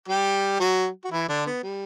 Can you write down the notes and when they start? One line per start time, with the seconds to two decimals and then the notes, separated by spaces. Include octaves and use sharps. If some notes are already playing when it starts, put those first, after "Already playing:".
0.08 G3 G4
0.60 F#3 F#4
1.05 F#4
1.11 E3 E4
1.29 D3 D4
1.46 B3
1.63 G3